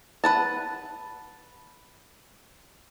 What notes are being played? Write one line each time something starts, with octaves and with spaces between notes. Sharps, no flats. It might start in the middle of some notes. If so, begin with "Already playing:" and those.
B4 F#5 A5